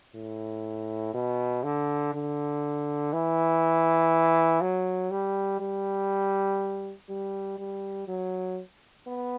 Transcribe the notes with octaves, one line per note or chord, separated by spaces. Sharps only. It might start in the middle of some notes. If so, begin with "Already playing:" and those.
A2
B2
D3
D3
E3
F#3
G3
G3
G3
G3
F#3
B3